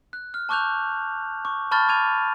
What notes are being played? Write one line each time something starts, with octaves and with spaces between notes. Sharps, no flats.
F#6
F6
A5 C#6 D6 F#6 G6 F7
C#6 D6
A5 B5 C#6 F6 G6 A6
D6 G#6 D#7 F7